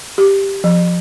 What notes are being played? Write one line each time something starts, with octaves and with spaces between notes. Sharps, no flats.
G4
F3